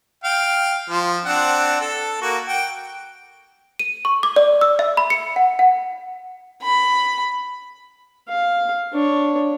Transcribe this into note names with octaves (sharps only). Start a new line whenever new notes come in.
F5 G5
F3
C4 D4 F#5
A4
A#3 F#4
F#5 G5
D#7
C#6
D6
D5
E6
E5
B5
C#7
F#5
F#5
B5
F5
D4 C#5